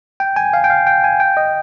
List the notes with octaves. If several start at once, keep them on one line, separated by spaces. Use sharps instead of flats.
G5
G#5
F5
G5
F5
G5
G#5
G5
D#5